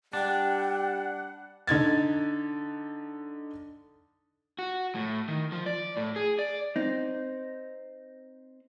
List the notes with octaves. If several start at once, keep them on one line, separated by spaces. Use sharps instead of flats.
G3 D4 F#5 G5
D3 D#4 G#6 A6
F#4
A2
D#3
F3
D5
A2
G#4
D5
C4 D#4